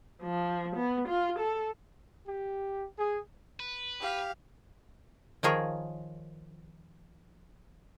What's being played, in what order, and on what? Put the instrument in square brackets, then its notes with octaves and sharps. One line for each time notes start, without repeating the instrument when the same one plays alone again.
[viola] F3
B3
F4
A4
[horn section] G4
G#4
[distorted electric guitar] B4
[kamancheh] G4 F5
[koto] D#3 F3 G#4 A#4 C#5